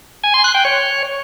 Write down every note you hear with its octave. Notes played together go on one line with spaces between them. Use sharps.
G#5
C6
F#6
G5
C#5